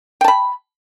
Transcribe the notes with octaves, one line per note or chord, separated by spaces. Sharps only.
G5 A5 B5